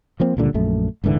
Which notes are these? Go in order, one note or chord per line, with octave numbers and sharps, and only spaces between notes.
F3 A#3 C4
C#2 A#2 D3 G3
A#1 F#2 A3
D#1 G#2 D3 E3